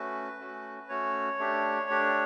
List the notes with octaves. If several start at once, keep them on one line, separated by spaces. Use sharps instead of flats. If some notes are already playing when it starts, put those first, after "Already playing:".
Already playing: A3 C#4 F#4 B4
A3 C#4 F#4
A3 C#4 F#4 C#5
A3 D4 G4
A3 D4 G4